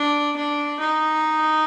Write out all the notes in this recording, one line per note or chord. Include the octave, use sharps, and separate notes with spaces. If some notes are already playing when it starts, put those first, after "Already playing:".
Already playing: D4
D4
D#4